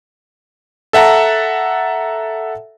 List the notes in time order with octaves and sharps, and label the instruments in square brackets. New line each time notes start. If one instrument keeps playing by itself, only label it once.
[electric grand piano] A4 E5 F#5 A5 A#5